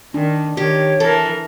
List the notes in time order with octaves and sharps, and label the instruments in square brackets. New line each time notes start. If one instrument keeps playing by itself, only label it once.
[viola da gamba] D#3 [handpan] D4
[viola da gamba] D#3 [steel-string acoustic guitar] G4 [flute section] C#5
[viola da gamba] E3 A#4 [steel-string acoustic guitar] A4